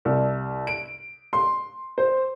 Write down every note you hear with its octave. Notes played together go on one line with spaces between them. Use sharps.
C2
D7
C6
C5